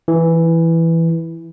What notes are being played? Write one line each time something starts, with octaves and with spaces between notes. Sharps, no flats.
E3